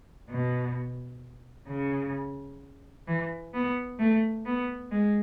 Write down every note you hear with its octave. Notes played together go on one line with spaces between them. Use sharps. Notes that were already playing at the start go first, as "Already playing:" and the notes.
B2
C#3
E3
B3
A3
B3
G#3